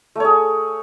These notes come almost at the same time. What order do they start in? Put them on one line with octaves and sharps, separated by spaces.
A3 C#5 G#4